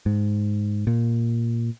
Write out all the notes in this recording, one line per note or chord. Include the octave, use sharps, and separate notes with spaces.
G#2
A#2